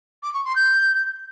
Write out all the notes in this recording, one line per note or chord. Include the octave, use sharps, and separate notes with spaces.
D6
C#6
C6
G6